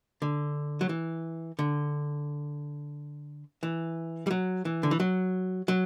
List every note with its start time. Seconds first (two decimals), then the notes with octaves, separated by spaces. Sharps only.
0.22 D3
0.81 F#3
0.89 E3
1.59 D3
3.63 E3
4.27 G3
4.31 F#3
4.65 E3
4.83 D3
4.91 E3
5.00 F#3
5.68 F#3